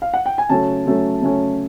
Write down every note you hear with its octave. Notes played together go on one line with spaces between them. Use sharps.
F5
F#5
G5
G#5
C#3 F#3 A3 C#4 A5
C#3 F#3 A3 C#4
C#3 F#3 A3 C#4